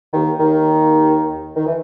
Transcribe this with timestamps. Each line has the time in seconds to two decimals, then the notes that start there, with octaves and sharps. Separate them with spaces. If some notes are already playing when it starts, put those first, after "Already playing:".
0.13 D#2 D#3
0.40 D#2 D#3
1.56 D#3
1.66 E3